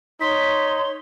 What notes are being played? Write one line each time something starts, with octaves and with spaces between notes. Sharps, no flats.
D#4 C#5 C6 B6